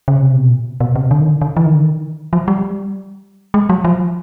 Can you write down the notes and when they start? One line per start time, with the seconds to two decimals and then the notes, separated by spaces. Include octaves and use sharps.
0.08 C#3
0.22 C3
0.36 B2
0.50 A#2
0.81 B2
0.96 C3
1.11 D3
1.21 D#3
1.31 D3
1.41 D3
1.57 E3
1.65 D#3
1.74 D3
1.83 D#3
2.33 F3
2.48 G3
3.54 G#3
3.70 F#3
3.85 F3